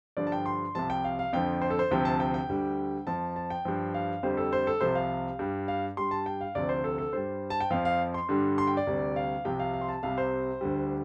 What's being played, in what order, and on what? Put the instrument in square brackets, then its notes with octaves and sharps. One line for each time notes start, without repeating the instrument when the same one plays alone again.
[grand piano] G2 D3 F3 D5
A5
G5
C6
C2 C3 F3 A5
G5
F5
F5
F2 D3 F3 G5
C5
A4
C5
D2 C3 F3 G5
A5
G5
G5
D2 D3 G3
F2 F3 A5
A5
G5
G2 F3
F5
F2 D3 G3 C5
A4
C5
A4
C2 C3 F3 C5
F5
G2 G3
F5
G2 G3 C6
A5
G5
F5
D2 C3 F3 D5
C5
A4
A4
G2 G3 C5
A5
G5
F2 F3 F5
F5
C6
G2 D3 G3
C6
G5
D5
D2 C3 G3
F5
C2 C3 F3 G5
F5
F5
C6
A5
C2 C3 G3 F5
C5
D2 D3 G3